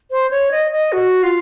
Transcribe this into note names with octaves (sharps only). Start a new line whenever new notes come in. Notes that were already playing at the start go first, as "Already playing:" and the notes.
C5
C#5
D#5
D#5
F#4
F4